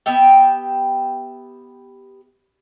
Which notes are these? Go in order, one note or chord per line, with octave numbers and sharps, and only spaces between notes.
B3 G4 E5 G5